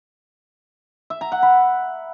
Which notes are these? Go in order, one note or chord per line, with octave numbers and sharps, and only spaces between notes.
E5
A#5
F#5
B5